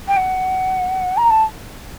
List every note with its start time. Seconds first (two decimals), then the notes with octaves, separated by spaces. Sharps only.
0.08 G5
0.17 F#5
1.17 A#5
1.30 A5